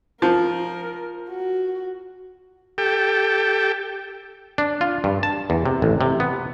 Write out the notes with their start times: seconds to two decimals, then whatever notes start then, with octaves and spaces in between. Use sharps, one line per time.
0.22 F3 A#4
1.30 F#4
2.78 G4 A4 G5
4.58 D4
4.81 F4
5.04 G2
5.23 A5
5.50 E2
5.66 C3
5.82 A1
6.01 C3
6.20 B3